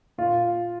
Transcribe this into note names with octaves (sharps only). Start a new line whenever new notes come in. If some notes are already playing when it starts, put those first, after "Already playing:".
A#2 F4